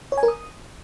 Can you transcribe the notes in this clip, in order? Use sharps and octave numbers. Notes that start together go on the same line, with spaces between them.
C#5
G#5
A#4
D#6